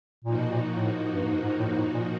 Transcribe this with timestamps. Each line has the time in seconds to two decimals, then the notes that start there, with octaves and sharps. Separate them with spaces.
0.24 A#2 F3 A#3 D#4 F#4
0.38 B2
0.51 A#2
0.75 A2
1.13 G2
1.26 G#2
1.43 G#2
1.60 A2
1.72 G#2
1.77 A2
1.94 A#2